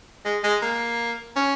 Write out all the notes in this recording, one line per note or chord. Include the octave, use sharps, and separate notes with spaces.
G#3
G#3
A#3
C#4